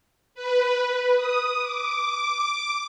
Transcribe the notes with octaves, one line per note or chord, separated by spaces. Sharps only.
B4
D#6
D6